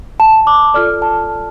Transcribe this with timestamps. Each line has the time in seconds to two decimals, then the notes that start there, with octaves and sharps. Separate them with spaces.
0.20 A5
0.47 D6
0.74 F4 A4 D5 F6
1.02 A5